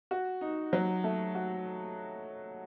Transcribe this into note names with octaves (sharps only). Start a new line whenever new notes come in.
F#4
D#4
F#3
A3
F#4